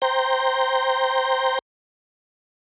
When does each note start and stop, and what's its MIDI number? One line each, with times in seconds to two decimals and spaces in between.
0.02 1.59 72
0.02 1.59 79
0.02 1.59 82
0.02 1.59 84